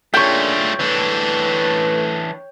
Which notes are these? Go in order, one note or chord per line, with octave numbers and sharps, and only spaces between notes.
A#2 A3 D4 F4 G#4 C#5 G5
E3 A3 D4 B4